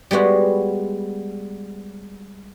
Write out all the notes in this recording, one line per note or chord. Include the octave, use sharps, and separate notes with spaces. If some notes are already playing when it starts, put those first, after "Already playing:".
G3 G#3 B3 F#4